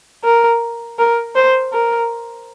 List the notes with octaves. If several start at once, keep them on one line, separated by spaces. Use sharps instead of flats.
A#4
A#4
C5
A#4